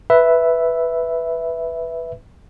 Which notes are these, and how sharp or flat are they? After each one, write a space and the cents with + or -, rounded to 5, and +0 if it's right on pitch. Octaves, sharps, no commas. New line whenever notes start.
B4 +0 E5 +0